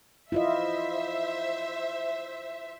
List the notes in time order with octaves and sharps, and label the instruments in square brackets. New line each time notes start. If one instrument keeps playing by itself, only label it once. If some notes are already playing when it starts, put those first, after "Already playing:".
[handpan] E4 F4 D#5 [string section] C5 E5